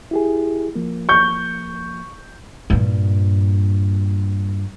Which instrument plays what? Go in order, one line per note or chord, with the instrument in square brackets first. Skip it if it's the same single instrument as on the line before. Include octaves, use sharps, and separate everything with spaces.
[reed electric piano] E4 G4 G#4
F3 A#3
[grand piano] C#6 G6
[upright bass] G2 A#2